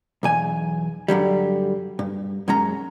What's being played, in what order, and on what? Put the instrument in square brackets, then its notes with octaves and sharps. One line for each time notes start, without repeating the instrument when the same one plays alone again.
[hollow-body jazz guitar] B1 E2 G#5
G2 D3 F#3 G3
G2
F#2 G#3 C#4 A#5